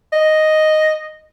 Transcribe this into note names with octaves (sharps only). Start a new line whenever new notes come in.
D#5